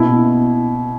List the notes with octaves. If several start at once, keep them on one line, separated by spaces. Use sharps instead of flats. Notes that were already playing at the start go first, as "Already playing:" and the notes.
Already playing: B2 A#3 E4